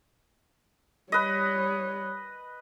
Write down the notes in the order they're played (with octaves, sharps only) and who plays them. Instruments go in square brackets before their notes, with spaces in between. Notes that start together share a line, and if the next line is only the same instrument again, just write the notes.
[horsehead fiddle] G3 C#5 [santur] B4 D#5